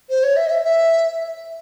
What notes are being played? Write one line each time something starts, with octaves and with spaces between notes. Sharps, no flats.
C5
C#5
E5
D#5
E5
E5